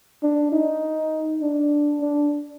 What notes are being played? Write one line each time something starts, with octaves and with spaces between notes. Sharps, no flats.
D4
D#4
D4
D4